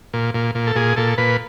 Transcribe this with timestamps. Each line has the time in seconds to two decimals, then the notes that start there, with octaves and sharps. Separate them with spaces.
0.14 A#2
0.35 A#2
0.55 A#2
0.67 A4
0.76 A#2 G#4
0.96 A#2 A4
1.18 A#2 B4